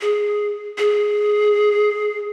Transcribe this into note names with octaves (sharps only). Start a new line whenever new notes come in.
G#4
G#4